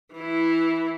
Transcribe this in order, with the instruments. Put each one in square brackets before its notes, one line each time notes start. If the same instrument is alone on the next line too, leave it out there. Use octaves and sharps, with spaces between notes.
[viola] E3 E4